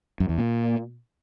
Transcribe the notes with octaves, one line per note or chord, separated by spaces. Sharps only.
F#2
E2
A#2